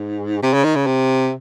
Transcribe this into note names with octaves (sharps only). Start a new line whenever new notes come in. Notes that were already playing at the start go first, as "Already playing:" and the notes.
Already playing: G#2
C3
C#3
D#3
C#3
C3